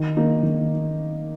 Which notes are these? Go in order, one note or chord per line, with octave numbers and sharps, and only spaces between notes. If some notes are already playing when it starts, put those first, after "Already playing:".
Already playing: D#3
A#3 D#4
D#3